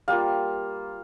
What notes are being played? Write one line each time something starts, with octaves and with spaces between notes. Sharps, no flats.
G3 A#3 F4 F5